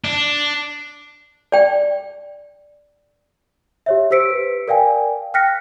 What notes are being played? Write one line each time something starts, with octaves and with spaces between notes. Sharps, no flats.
D4
D5 G5
G4 C#5 E5
G4 C5 E6 B6 C#7 D7
B4
A#4 D5 F5 G5 G#5
G5 F6 F#6 A#6 B6 C#7